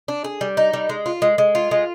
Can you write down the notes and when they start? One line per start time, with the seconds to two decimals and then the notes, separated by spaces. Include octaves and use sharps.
0.08 D4
0.24 G#4
0.41 G3
0.57 D#4
0.73 G3
0.89 G#3
1.06 F4
1.22 G#3
1.38 G#3
1.55 F4
1.71 G#3